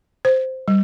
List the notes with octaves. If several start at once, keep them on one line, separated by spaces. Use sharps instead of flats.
C5
G3